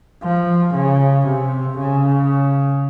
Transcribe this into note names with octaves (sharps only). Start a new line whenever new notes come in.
F3
C#3
C3
C#3